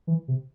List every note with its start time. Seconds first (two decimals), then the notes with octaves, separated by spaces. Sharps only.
0.07 E3
0.28 C3